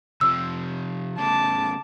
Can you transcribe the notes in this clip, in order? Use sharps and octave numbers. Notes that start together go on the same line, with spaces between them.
C3 F3 E6
A2 C#3 A5 D6